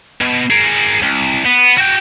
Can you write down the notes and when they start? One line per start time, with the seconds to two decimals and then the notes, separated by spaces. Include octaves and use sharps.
0.21 B2
0.50 G#4 A#4
1.02 C2
1.45 B3
1.78 F#4 G5